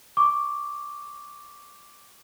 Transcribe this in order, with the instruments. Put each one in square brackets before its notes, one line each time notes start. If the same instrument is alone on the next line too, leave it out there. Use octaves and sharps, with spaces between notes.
[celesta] C#6 D6